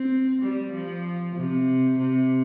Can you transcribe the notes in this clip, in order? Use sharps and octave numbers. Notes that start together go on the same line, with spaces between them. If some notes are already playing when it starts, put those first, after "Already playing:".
Already playing: C4
G3
F3
C3
C3